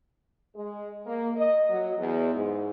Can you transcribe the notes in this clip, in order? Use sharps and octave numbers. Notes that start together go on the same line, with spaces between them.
G#3
A#3
D#5
F#3
E2
G#2